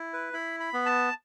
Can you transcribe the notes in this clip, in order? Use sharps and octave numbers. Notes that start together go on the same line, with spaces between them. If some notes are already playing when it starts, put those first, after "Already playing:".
Already playing: E4
B4
E4 B5
B5
B3
A5